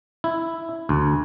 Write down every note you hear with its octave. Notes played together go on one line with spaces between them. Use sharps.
E4
D2